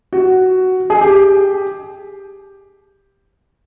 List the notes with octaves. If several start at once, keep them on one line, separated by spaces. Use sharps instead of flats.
F#4
G#4
G4